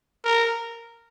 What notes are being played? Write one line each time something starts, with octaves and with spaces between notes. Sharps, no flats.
A#4